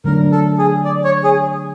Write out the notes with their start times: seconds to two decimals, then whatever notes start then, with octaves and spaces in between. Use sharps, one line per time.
0.04 D3 F#3 A3 D4 A#4
0.32 A4
0.58 G#4
0.85 D5
1.04 C#5
1.24 G#4